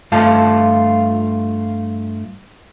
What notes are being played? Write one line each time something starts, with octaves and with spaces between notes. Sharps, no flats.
G2 A3 F4 A5